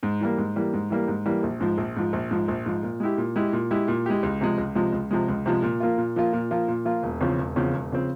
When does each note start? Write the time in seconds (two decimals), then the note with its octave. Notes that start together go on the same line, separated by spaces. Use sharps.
0.03 G#2
0.21 E3 G3 A#3
0.38 G#2
0.56 E3 G3 A#3
0.73 G#2
0.90 E3 G3 A#3
1.08 G#2
1.26 E3 G3 A#3
1.43 A#1
1.60 G#2 F3
1.78 A#1
1.96 G#2 F3
2.13 A#1
2.31 G#2 F3
2.48 A#1
2.66 G#2 F3
2.83 A#2
3.00 G#3 E4 G4
3.17 A#2
3.36 G#3 E4 G4
3.53 A#2
3.71 G#3 E4 G4
3.88 A#2
4.06 G#3 E4 G4
4.23 C#2
4.41 C3 F3 G#3
4.58 C#2
4.75 C3 F3 G#3
4.92 C#2
5.11 C3 F3 G#3
5.28 C#2
5.46 C3 F3 G#3
5.63 A#2
5.80 F3 A#3 F4
5.98 A#2
6.16 F3 A#3 F4
6.33 A#2
6.51 F3 A#3 F4
6.68 A#2
6.85 F3 A#3 F4
7.03 E1
7.21 E2 C#3 F3 C4
7.39 E1
7.56 E2 C#3 F3 C4
7.73 E1
7.92 C#3 F3 C4